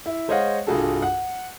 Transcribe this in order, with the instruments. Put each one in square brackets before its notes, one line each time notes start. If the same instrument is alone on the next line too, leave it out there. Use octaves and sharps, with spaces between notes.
[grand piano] E4
G#3 C5 C#5 D#5 F5 F#5
C2 G2 F4 F#4 G#4 A4
F#5